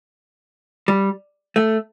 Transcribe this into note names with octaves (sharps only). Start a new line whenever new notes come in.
G3
A3